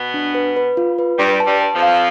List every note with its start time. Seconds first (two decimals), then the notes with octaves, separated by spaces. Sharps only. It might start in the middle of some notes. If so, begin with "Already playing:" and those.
Already playing: B2 B3
0.14 D4
0.35 B4
0.57 B4
0.77 F4
0.99 B4
1.18 G2 G3 B4
1.40 A5
1.47 G2 G3
1.61 A5
1.75 F2 F3
1.82 F5